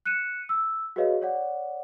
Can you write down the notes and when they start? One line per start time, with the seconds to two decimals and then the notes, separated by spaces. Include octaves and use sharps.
0.06 F#6 C#7 D#7 E7
0.49 E6
0.96 F#4 G#4 B4 C#5 D#5 F5
1.21 C#5 D5 F#5